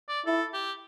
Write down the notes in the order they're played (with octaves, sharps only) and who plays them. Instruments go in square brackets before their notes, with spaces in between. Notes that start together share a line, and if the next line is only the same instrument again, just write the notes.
[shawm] D5
[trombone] E4 [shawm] A4
[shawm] G4